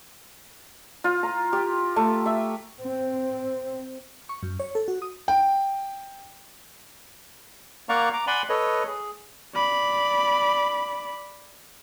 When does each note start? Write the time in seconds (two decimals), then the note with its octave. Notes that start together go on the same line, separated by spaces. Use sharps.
1.04 F4
1.23 A#5
1.53 G4
1.96 A3
2.26 E5
2.83 C4
4.29 C#6
4.43 F#2
4.60 C#5
4.75 A4
4.88 F#4
5.02 D#6
5.28 G5
7.89 A#3 D5 F5 F#5 A#5 C#6
8.13 A#5 D6
8.27 D5 F#5 G#5 B5 C6
8.49 A4 B4 C#5 D#5
8.87 G#4
9.54 D5 B5